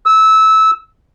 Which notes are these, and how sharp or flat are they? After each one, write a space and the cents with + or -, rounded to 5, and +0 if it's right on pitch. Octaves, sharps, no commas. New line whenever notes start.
E6 -20